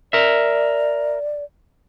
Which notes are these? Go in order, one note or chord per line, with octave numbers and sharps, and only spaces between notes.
A#4 D5 E5